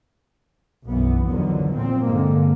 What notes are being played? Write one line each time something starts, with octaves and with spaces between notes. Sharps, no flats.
B1 F#2 E3 B3
E2 D3 D#3 F3 F#3
A#2 F3 C4
G2 D3 G#3 A#3